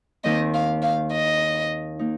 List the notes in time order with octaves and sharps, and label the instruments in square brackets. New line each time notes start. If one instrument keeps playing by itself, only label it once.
[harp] D#2 D#3 C4 [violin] D#5
[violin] F5
F5
D#5
[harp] A#3 D#4